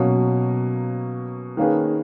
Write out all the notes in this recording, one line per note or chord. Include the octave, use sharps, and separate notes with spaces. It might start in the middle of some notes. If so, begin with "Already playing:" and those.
Already playing: B2 F#3 A#3 C#4
D#3 A#3 C#4 G#4 B4